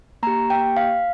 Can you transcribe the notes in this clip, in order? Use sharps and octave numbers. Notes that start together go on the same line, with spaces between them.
A#3 G4 A#5
G5
F5